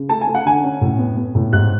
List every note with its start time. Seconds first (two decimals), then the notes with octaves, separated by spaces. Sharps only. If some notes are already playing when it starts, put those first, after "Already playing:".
Already playing: C#3
0.09 A3 A5
0.21 G#5
0.27 A3
0.35 F#5
0.45 D3 G#5
0.64 C#4
0.81 A2
0.99 B3
1.17 B3
1.35 A2
1.53 G#2 F#6